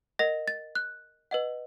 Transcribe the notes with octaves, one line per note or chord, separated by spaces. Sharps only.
A#4 D#5 F#5 A#6
A6
F#6
B4 D#5 F#5